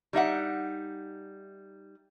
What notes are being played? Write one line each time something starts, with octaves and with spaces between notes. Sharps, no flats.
G3 D#4 E5 F#5